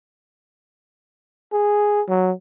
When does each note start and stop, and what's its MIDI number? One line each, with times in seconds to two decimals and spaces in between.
1.53 2.02 68
2.08 2.32 54